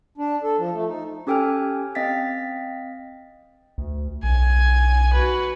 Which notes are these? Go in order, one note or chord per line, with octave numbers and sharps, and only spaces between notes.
D4
A4
F3
A3
D#4
C#4 G4 A4 G5 G#5 F6
C4 D#5 F5 G5 A6 B6
D2
B1 G#5
F#4 B4